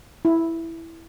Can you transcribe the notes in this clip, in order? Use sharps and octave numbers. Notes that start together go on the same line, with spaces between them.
E4